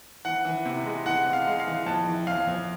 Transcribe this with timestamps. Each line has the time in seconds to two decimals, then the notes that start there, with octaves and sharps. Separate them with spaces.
0.25 E3 F#5
0.45 E3
0.65 C3
0.86 G#3
1.06 E3 F#5
1.25 C3
1.33 F5
1.47 G#3
1.60 F5
1.67 E3
1.86 F2 A5
2.06 E3
2.27 F2 F5
2.47 F2